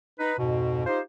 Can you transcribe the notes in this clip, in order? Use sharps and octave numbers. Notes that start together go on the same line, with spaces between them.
D#4 B4
F2 G#2 B2
D#4 F4 G4 C5